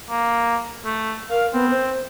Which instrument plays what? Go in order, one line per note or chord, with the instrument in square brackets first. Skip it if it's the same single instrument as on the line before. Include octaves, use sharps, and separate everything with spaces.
[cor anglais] A#3
A3
[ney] A#4 [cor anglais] F5
[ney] B3 [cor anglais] C4
[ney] C5